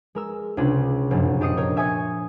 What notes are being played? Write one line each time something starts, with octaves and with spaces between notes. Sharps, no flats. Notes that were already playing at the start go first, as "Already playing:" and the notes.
G#3 A#4 E6
C#2 C3 C#4 D4 F4
F1 F#2 A#2
D4 G4 D#5 D#6 C7 C#7
A#4 C#5 G5
E5 G#5 C#6 D#6 G#6 C#7